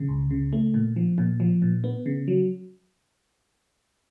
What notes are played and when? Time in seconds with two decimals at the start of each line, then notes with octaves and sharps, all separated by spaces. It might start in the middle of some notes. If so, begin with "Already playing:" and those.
Already playing: C#3
0.09 C#2
0.31 C#3
0.53 A3
0.74 A#2
0.96 F3
1.18 A#2
1.40 F3
1.62 A#2
1.84 B3
2.06 C#3
2.28 F#3